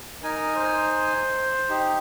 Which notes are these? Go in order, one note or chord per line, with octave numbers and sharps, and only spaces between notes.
D#4 A#4 G#5
C5
D#4 G4